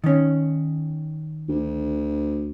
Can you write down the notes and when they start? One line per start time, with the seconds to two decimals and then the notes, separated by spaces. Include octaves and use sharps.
0.04 D#3 C#4
1.49 D2